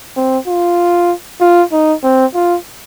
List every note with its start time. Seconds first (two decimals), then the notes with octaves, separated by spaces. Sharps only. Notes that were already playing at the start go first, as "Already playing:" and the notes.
0.16 C4
0.48 F4
1.41 F4
1.72 D#4
2.04 C4
2.35 F4